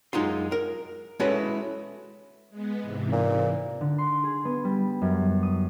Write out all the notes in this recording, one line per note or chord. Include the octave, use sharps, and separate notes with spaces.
F#2 G#3 D#4 F4 C6
A#4
G#3 C#4 E4 F#4 A4 B4
G#3 B3
G#2 C3 E3
A#2
D3
C6
G#4
B3
G3
F#2
D#6